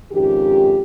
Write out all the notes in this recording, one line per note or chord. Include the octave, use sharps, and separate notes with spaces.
F2 G#2 D#3 C#4 G4